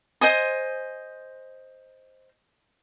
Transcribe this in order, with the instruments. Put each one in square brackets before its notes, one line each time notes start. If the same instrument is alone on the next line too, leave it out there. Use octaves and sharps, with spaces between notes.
[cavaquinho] C5 D#5 G#5 D#6